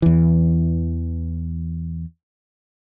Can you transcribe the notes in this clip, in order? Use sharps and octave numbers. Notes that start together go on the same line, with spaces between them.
E2 E3